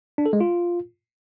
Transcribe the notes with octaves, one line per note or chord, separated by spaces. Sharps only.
D4
A4
G#3
F4